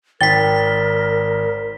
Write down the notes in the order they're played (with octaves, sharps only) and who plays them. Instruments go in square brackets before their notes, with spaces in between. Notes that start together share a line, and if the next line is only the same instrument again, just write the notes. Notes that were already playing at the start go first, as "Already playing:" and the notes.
[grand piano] G#1 [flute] A#4 [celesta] G5 A6 [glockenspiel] B6 G7